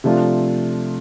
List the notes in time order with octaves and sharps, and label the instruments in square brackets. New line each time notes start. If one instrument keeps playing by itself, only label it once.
[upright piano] C3 F3 A3 D4 F4